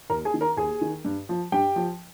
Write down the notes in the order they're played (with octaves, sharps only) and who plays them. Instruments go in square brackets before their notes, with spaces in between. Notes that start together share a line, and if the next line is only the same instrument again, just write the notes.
[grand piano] D#2 A#4 A#5
G#4 G#5
D#3
A#4 A#5
D#2 G#4 G#5
D#3
G2
F3
G2 G4 G5
F3